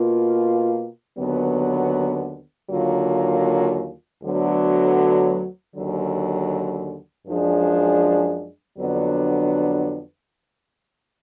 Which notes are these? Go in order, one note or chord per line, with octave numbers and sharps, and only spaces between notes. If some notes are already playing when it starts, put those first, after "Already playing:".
Already playing: B2 A#3 F4
D#2 D3 F#3 B3
D#2 D3 F#3 A#3 F4
D2 D3 F#3 B3
D#2 D3 F#3
F#2 F3 G#3 D4 G#4
F2 D3 F#3 B3 D4